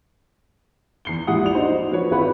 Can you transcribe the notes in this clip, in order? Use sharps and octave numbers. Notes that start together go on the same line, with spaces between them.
E2 C7 G7
A#1 G#2 E4 G4 F#5 D#6
D5 F7
D4 D#4 F#4 C5
F3 F#4 B4 C#5
G#1 E4 F#4 B4 F#5 B5